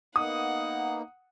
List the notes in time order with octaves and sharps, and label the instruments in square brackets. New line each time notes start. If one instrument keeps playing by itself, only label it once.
[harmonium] A#3 B3 D#4 [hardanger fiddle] F#5 [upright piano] D#6